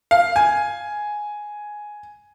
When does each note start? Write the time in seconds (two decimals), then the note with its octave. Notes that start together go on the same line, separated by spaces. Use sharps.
0.11 F5
0.36 G#5